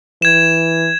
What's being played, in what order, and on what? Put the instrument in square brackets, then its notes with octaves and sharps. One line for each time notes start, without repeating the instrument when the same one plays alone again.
[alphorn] E3 [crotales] G#6 E7